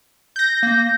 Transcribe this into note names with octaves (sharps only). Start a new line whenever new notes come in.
G6 A#6
A#3